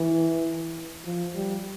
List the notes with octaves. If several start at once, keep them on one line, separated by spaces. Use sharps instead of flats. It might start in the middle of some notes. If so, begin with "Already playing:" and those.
Already playing: E3
F3
G3